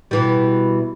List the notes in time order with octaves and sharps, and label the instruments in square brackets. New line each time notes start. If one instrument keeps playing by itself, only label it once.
[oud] B2 E3 G3